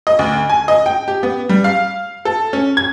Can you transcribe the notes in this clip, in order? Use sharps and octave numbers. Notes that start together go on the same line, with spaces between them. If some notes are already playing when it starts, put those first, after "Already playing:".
D#5
D2
G#5
D#5
G5
G4
B3
G3
F5
A4
C#4
G#6